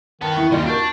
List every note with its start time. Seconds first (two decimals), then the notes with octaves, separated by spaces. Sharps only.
0.22 D#3 B3 A5
0.35 E2 E4 C#6
0.52 D#2 C#3 G3 F4 D5 D#5
0.66 D4 F#4 A#4 G6 D7